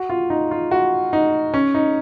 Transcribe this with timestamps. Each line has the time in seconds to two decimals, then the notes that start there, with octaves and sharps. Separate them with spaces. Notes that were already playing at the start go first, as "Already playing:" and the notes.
Already playing: F#4
0.10 F4
0.30 D#4
0.51 F4
0.71 F#4
1.13 D#4
1.54 C#4
1.74 D#4